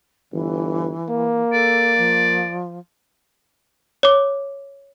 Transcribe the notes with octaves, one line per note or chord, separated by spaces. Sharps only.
G1 E3
A#3
A4 D5
F3
C#5 D6